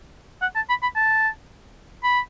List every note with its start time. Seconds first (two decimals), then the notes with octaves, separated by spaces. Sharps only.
0.42 F#5
0.55 A5
0.69 B5
0.82 B5
0.96 A5
2.04 B5